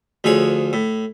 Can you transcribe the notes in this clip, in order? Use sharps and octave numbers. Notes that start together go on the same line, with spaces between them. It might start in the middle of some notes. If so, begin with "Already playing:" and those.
D2 F3 G#4 C#5
A2